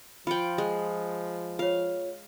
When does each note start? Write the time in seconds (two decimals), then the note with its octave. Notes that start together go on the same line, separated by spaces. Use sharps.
0.27 F3 F4 G5 B5 C#7 F#7
0.58 G#3
1.59 F4 C#5 F5